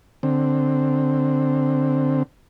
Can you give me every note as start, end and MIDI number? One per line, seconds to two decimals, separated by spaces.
0.23 2.23 50
0.23 2.23 60